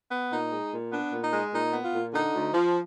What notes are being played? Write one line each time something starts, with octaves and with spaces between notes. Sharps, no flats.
B3
A#2 D#4
G#3
A#2
B3 D4
A#2
D#4
G#3
A#2 D#4
B3
F4
A#2
D3 D#4
D2
F3